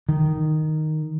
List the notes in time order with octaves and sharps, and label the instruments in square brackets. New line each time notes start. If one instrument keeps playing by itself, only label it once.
[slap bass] D#3